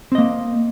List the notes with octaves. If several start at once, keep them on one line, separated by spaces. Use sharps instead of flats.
A#3 C4 D#5